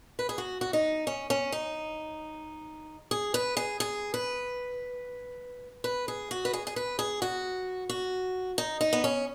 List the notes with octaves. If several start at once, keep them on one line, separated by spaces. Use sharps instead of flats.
B4
G#4
F#4
F#4
D#4
C#4
C#4
D#4
G#4
B4
G#4
G#4
B4
B4
G#4
F#4
B4
G#4
G#4
B4
G#4
F#4
F#4
D#4
D#4
B3
C#4